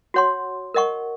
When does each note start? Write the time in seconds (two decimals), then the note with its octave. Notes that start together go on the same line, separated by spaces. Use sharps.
0.14 F#4 C#5 F#5 C6
0.74 A#4 D#5 F#5 C#6